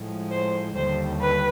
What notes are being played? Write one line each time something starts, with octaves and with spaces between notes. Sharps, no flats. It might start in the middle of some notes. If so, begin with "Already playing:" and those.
Already playing: A2 F3 G#3
C5
D#2 D3 G3 C5
B4